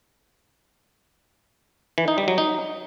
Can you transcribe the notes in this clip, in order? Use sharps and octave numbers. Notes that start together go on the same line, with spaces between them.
E3
D#4
G3
F#3
D#4